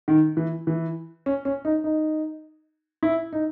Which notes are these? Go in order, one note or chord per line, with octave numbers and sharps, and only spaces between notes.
D#3
E3
E3
C#4
C#4
D#4
D#4
E4
D#4